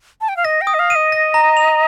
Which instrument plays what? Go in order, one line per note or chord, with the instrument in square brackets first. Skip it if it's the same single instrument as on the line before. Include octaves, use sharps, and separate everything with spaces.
[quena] A5
G5
F5
[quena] D#5 [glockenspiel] A#6
[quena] G5
[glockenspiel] D#6
[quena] D#5
F5
[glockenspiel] D#7
[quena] D#5
[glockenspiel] A#6
A#5
F7